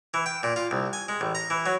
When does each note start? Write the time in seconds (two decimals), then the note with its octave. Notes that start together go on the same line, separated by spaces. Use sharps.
0.14 E3
0.26 G5
0.43 A#2
0.56 F4
0.71 C2
0.93 G#5
1.09 G#3
1.21 A1
1.35 A#5
1.50 E3
1.66 F#3